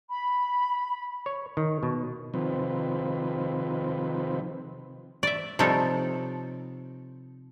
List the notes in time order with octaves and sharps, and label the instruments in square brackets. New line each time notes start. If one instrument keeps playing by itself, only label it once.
[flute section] B5
[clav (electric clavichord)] C#5
D#3
B2
[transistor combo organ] C3 D#3 F3 C4 B4
[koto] D5 E5
C3 F3 G3 D#4 A4 C#5